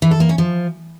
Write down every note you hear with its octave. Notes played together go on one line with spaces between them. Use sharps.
E3
A4
A#3
C#4
F3